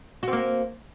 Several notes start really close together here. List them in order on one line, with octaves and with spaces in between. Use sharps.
F#4 C4 A#3